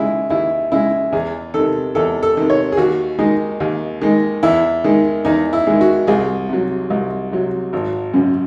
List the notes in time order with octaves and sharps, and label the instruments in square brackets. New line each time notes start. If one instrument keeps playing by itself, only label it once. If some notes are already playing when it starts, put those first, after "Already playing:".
Already playing: [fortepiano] D#2 C#3 G#3 E4
D#2 E4
C#3 G#3 E4
E2 G#4
C3 D#3 A4
E2 A4
A4
C3 D#3
C#5
G#4
D#2 F#4
D#3 G#3 D#4
D#2
D#3 G#3
E2 E4
D#3 G#3
E2 D#4
E4
D#3 G#3
F#4
C2 G#4
C3 F#3
C2
C3 F#3
G#1
F#2 C#3